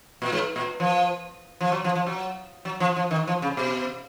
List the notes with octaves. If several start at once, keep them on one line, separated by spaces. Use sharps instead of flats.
A#2
G#2
A#2
F3
F3
F#3
F3
F3
F#3
F#3
F3
F3
D#3
F3
C#3
B2